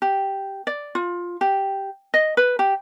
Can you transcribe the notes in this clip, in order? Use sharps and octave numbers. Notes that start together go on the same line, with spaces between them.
G4
D5
F4
G4
D#5
B4
G4